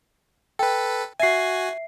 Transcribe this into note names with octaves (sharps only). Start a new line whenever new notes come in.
A4 B4 G5
F#4 E5 G#5 C7